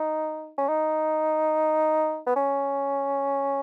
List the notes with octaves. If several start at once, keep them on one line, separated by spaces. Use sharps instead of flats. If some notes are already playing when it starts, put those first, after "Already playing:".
Already playing: D#4
C#4
D#4
B3
C#4